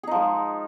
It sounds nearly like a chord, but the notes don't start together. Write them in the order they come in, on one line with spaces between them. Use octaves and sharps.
G#4 D#4 F3 G#3